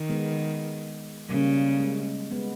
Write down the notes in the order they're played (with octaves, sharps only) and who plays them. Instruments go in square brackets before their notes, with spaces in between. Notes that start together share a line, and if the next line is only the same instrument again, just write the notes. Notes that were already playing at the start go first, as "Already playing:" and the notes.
Already playing: [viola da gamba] D#3
[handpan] G#3 B3
[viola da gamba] C#3 [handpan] G3 A#3
[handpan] G#3
G#3 B3